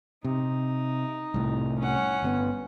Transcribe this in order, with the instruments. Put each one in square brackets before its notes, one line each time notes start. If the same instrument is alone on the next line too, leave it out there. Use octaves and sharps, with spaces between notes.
[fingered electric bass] C3 [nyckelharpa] D#4
[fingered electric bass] C2 A2
[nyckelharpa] C#4 F#5
[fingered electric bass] G1 A#2 B3